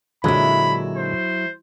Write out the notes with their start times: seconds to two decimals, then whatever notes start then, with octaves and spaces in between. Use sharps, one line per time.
0.24 A#2 D3 F#3 G#3 E4 B5
0.96 C5